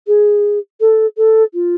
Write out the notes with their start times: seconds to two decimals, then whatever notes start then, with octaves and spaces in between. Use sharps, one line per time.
0.07 G#4
0.80 A4
1.17 A4
1.54 F4